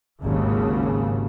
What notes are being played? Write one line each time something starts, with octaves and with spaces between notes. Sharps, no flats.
G#1 D#2 C#3